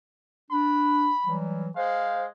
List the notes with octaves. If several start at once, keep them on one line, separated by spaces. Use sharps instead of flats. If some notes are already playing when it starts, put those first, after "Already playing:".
D4 B5
E3 F#3 G3
G#3 C5 F5